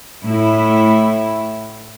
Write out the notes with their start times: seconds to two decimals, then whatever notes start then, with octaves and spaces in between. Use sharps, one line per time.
0.23 A2 E4